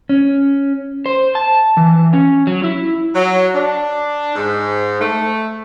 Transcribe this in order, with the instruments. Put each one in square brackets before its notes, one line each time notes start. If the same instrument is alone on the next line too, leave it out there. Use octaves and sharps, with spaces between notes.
[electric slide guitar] C#4
C5
A5
E3
C#4
F#3
E4
[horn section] F#3
D4
G#2
A3